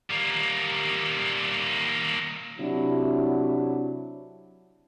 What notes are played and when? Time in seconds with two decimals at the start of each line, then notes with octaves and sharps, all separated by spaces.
0.10 G3 A#3
2.59 C3 F#3 D4 E4